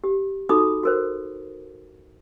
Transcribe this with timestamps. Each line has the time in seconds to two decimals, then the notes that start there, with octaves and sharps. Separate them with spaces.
0.04 G4
0.49 D#4 F#4 A4 B5 D6 D#6
0.83 F#4 A#4 C5